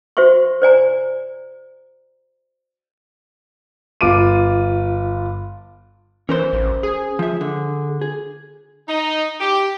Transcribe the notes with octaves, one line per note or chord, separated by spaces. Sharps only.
F#4 C5 E5 C6 C#6
C5 D5 G#5 A#5
G1 F4 D6 D7 D#7
E3 C#4 A#4 C5
A1
G#4
F3 E5
D3
G#4
D#4
G4